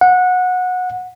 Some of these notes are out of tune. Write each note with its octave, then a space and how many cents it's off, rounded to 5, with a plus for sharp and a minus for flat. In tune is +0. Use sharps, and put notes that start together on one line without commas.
F#5 -20